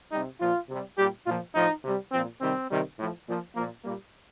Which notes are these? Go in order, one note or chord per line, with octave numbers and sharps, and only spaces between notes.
C3 G3 D#4
A#2 F3 F4
C3 G3
A#2 G3 G4
A#2 F3 F4
A2 F3 D#4
C3 G3
A#2 F3 C4
C3 D#3 G3 C4
C3 D#3 G3
A2 F3
A#2 F3
A#2 F3 A#3
A#2 G3 A#3